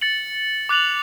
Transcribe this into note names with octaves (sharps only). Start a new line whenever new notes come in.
A6 C#7 F#7
D6 F#6 A6 F7 F#7